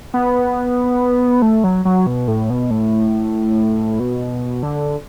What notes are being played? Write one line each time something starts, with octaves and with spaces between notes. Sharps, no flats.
B3
A3
F#3
F#3
B2
A2
B2
A2
B2
D3